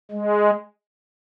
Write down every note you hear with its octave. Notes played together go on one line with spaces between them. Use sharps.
G#3